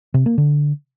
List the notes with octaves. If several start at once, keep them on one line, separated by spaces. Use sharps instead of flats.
C3
A#3
D3